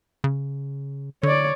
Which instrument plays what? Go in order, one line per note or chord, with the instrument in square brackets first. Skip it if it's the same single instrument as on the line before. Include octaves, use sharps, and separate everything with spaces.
[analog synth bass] C#3
[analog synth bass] D3 [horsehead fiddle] C#5 D5